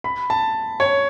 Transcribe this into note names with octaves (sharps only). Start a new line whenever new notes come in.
B5
A5
C#5